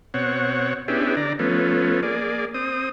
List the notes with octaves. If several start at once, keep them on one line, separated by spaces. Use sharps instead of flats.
B2 C4 C#5 F#5
B3 C#4 D4 E4 G4 G#4
D3 D5 A#5
F3 A3 B3 C#4
A#3 G#4 D5
C4 D#6